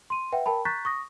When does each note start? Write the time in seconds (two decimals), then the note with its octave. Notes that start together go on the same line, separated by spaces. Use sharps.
0.10 C6 D#7
0.32 B4 E5 F#5 G5
0.46 A#4 G5 A5 B5
0.65 A#5 C#6 F#6 G6 A6 B6
0.85 C#6 D#6 A#6